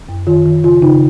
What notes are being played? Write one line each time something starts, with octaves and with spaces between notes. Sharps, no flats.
F#2
D#3 F4
D#3
C#3 F4
C#3 D#4